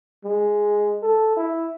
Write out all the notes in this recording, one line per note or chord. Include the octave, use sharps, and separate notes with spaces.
G#3
A4
E4